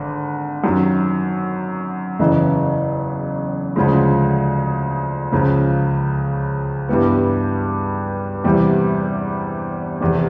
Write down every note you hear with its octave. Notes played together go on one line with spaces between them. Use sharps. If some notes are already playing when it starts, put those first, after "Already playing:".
Already playing: G#1 D3
F#2 D#3 F#3
F#1 E2 C#3 E3
D2 C#3 F3 G#3
C#2 C#3 F3
G2 E3 G3 B3
E2 C3 E3 G3
F1 E2 C3